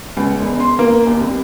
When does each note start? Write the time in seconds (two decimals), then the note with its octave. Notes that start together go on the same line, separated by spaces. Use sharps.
0.17 C#2
0.39 E1
0.60 C6
0.79 A#3
1.07 D#2
1.21 C2